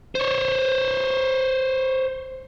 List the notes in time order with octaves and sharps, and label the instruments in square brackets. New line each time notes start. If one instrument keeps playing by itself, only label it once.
[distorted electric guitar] C5 C#5